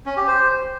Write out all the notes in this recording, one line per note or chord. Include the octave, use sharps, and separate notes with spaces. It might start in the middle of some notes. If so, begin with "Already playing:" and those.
C#4
G4
C5